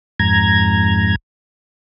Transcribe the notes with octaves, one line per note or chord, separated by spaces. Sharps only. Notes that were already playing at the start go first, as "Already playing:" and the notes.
F2 G#2 A#5 G#6